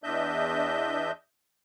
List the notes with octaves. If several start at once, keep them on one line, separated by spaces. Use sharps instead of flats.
E2 D4 D#5 E5 G6